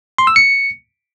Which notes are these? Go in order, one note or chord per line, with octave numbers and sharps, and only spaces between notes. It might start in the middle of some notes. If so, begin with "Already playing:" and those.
C6
E6
C#7